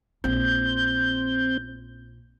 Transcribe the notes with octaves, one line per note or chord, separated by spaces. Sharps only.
A#1 C4 F4 G6